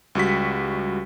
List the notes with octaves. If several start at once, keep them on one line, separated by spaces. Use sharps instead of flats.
C#2 G3 F#4 B6